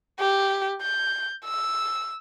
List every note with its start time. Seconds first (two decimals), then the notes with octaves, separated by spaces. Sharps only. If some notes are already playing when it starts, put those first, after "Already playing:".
0.20 G4
0.82 G6
1.45 E6